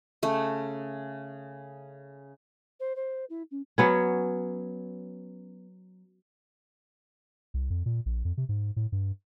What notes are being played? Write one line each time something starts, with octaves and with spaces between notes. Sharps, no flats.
C#3 A3
C5
C5
E4
C#4
F#3 B3 C#4
C2
F2
A#2
A#1
F2
C3
G#2
A2
G2